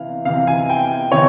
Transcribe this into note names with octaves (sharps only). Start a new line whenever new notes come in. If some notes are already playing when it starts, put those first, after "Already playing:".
Already playing: C3 E3 F5
C3 E3 F5
G#5
G5
C3 E3 C#5